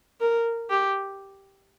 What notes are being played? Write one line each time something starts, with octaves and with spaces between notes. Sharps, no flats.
A#4
G4